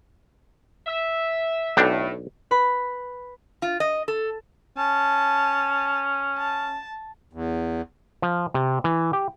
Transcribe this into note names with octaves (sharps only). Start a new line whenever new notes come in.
E5
B1 A2 D4 G5
B4 B5
F4
D#5
A4
C#4 A5
A5
E2
F3
C3
E3
G4